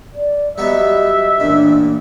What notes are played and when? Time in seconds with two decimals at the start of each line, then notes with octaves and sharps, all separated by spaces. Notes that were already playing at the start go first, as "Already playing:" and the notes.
0.14 D5
0.58 F#3 G3 B3 D#5 E5
1.40 A1 A#2 D4